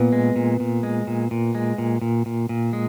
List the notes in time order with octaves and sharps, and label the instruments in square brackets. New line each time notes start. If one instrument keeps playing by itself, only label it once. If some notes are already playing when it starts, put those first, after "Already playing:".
Already playing: [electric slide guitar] A#2 [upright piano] B3
[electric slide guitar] G#3
A#2
A#2
G#3
A#2
A#2
G#3
A#2
A#2
A#2
A#2
G#3